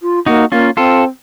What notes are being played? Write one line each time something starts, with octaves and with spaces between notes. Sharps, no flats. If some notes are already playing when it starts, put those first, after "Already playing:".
F4
A#3 D#4 F#4
A#3 C#4 F4
C4 F4 A4